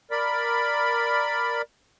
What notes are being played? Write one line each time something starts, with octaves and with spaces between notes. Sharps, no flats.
A#4 D5 B5